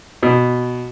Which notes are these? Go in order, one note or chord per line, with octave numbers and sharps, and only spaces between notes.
B2